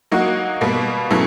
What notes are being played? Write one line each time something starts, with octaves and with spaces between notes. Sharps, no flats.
F#3 A#3 D#4 F#4
B2 G3 A#3
B2 F#3 A3 C#4 E4